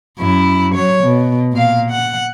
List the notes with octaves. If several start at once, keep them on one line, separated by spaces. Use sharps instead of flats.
F#2 E4
F#3 C#5
B2
A#2 F5
F#5